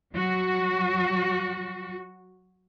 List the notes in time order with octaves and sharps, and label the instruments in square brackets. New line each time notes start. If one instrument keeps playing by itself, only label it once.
[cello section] F#3 F#4